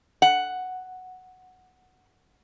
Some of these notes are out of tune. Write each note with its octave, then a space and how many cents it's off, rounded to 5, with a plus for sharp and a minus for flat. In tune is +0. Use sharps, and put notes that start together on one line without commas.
F#5 +0